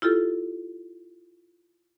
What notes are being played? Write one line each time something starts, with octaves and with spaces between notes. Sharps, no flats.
E4 F4 G4 A4